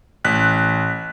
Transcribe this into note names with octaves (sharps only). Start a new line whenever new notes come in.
A1 F#6 B6